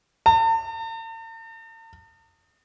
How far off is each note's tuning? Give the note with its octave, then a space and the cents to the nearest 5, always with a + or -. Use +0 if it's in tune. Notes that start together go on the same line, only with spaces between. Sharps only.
A5 +45